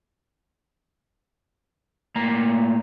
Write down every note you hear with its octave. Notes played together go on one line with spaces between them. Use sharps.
A2 A#3 A#5